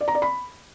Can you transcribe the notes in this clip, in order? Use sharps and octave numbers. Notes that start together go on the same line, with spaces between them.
D5
A#5
D5
B5